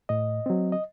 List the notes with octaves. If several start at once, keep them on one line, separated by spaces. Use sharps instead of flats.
A2 D#5
F#3 C4
D#5